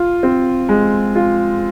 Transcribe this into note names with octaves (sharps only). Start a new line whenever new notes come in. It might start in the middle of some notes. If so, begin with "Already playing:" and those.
Already playing: F4
C4
G#3
F4